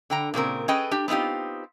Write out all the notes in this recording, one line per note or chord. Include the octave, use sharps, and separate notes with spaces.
D3 G5 A#5
A#2 C#3 C4 A#4
C#4 G#4 A4 B4 D#5 G5
D4 G4
B3 C4 D#4 F4 G4